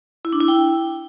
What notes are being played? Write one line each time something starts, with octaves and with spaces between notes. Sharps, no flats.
E4
D4
E4
G5